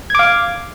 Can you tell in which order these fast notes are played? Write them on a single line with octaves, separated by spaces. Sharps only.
G#6 D6 F5